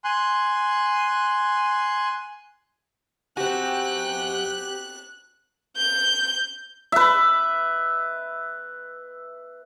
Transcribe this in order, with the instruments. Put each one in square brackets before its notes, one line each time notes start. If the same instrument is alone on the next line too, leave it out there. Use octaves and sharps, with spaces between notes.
[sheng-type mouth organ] G#5 C6 F#6
[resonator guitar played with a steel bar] C4 F#4 [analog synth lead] G4 [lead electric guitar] F#5 G#5 [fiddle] F#6
[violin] G6
[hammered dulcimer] B4 E5